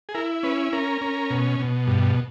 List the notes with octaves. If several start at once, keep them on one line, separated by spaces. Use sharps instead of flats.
G#4
E4 A#4
C#4 B4
C#4 A#4
C#4
B2
B2
G2